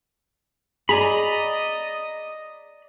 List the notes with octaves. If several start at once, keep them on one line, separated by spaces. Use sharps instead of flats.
G#4 D5 D#5 A#5 B5 D#6